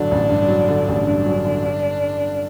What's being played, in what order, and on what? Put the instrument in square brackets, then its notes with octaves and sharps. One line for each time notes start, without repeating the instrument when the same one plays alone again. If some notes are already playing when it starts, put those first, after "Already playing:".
Already playing: [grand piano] A1 G2 D3 F#3 [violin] D4
[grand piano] A1
G2
F#3
D3
A1
[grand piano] G2 [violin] D4
[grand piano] F#3
D3
G2